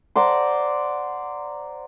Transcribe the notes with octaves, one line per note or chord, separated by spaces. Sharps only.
C5 D5 F#5 A#5